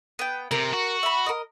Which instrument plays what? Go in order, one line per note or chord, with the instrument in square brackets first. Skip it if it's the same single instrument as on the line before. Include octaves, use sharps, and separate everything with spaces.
[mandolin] B3 G5
[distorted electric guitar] C3 [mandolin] A#4
[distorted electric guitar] F#4
[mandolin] E5 B5
A#4 D#5